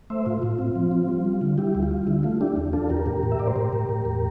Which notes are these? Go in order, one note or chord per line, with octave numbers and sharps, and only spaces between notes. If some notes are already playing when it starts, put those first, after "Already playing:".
A3 C5 E5
A2 F4
A2 F4
C4
F3
C4
G3
G3
D3
G3 E4 G4
D2
F4
G3
D3 E4
A3 F4
D4 E4 G4
E2
D4 F4 A4
E2 G4 A#4
A2 G4 A#4
A2
E5
A2 D5
C5
A2 G4 A#4
A2
A2
E2